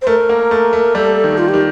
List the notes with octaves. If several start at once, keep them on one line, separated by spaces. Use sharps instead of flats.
C5
A3 A#4
A#3
A3
A3
G3 A4
D#3
F4
G4
D#3